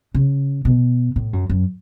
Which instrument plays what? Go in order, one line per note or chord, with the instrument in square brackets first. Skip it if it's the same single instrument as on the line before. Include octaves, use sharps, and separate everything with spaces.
[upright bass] C#3
B2
A2
F#2
F#2